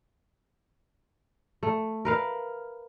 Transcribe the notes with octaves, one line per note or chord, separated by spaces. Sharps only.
A3
A#4 B4 F5